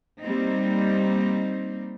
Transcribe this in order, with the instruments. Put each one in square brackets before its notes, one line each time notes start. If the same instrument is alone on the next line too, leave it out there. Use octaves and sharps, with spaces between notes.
[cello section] G3 A#3 C4 D#4